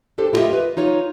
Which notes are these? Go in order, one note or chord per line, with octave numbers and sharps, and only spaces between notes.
D4 G4 A4 C5
E4 F4 G4 A4 D#5 E5
B4
D#4 F4 C#5